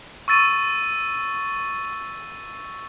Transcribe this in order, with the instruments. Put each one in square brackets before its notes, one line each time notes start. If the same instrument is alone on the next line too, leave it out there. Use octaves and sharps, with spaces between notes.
[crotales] C#6 E6 A6 D#7